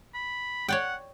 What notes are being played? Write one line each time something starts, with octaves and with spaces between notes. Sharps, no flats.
B5
C#5 D5 F#5 G5